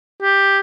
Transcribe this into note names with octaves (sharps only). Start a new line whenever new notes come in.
G4